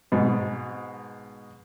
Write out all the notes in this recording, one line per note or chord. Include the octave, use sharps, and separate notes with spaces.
G#2 B2